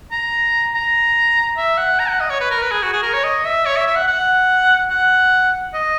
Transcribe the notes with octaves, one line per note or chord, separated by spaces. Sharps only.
A#5
A#5
E5
F#5
A#5
F#5
D#5
C#5
B4
A#4
B4
G#4
F#4
G#4
A#4
C#5
D#5
E5
C#5
E5
E5
F#5
F#5
F#5
D#5